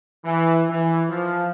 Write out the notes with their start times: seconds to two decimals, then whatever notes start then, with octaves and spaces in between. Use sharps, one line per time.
0.25 E3
0.70 E3
1.10 F3